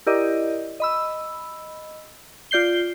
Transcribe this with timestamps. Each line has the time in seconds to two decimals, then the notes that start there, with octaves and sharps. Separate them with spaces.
0.06 E4 G4 A#4 D5 D#5
0.80 D#5 B5 E6
2.51 F4 D5 G6 C7 G7